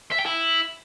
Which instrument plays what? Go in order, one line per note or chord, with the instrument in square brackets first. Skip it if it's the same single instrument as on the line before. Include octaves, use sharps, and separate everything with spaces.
[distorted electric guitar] E5
G5
E4